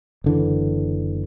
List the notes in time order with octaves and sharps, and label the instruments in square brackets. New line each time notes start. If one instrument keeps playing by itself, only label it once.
[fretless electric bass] F#1 D3 E3